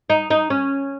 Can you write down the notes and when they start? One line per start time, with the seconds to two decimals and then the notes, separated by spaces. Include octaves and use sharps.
0.10 D#4
0.30 D#4
0.50 C#4